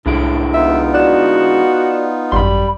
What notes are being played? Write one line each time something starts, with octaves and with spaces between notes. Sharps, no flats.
C2 A2 D3 G#3 E4 D7
B3 D#4 F4 E5
F#4 D5 F#6 E7
G#1 F#2 G3 B5 C6